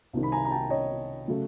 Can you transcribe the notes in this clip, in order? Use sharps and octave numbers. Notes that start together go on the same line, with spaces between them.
C2 C3 D#3
B5
G#5 A#5
A#5
G5 A5
C#5 D#5
C#3 F#3 A3